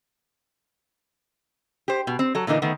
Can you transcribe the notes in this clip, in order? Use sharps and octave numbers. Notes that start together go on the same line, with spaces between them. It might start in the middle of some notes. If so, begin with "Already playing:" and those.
G4 C5
B2
C4
F#3 A4
A#2 D3 E3 D#4 A#4
D#3 A3 B3